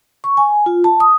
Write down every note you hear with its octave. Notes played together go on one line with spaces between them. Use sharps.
C#6
G#5
F4
A5
D#6